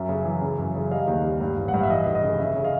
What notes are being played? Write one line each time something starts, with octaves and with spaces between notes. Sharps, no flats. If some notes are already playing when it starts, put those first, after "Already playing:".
Already playing: F#2 E5
C#3
E3
C#3
F#2
C#3
G3 D#5 F5
D#2
G3
G2
A1
F#5
G2 F5
E5
E3 D#5
F1
D#5
C#3
C#3 E5
C#3
D#5 F5